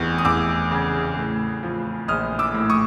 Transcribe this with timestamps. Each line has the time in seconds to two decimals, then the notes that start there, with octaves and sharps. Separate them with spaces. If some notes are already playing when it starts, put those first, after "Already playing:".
Already playing: F1 E2 C#6
0.18 D#6
0.25 E2 D6 E6
0.71 C#3
1.17 A2
1.63 F3
2.08 A#1 D#6 F6
2.39 D6 E6
2.54 A2
2.70 C#6 D#6